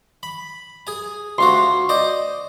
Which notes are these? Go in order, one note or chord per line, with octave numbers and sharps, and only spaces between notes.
B5
G#4 G#5
D2 F4 F#4 C6
C5 D5 D#5